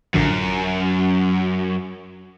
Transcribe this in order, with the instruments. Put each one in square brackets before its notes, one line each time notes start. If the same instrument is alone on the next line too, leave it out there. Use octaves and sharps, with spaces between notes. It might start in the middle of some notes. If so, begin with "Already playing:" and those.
[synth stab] A1 D3 F3 [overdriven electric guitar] F#2